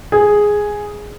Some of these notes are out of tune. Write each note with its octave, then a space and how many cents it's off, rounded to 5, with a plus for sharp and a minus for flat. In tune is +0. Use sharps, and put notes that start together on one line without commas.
G#4 +0